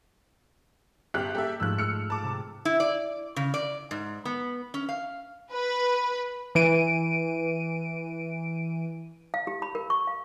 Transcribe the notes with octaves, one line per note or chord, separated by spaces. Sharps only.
G1 G4 F#6
A#3 G4 A4 E5
G#2 F3 A3 E6 F#6
E6 F6 C#7
A5 D6
C3
E4
D5
C#3
D5
G#2
B3
C#4
F5
B4
E3 D7 D#7
F5
G4
B5
A#4
C#6
F5